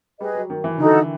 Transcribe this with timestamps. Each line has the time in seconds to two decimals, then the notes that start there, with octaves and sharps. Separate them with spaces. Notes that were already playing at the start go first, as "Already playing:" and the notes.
0.20 G3 G#4 B4 D#5
0.35 F#3
0.50 D#3
0.64 E3
0.78 D3 D#4 F#4 A4